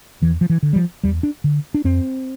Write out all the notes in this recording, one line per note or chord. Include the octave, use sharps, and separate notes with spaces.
E2 E3
F3
E3
D3
G3
F3
E2 G3
D4
D3
D4
F2 C4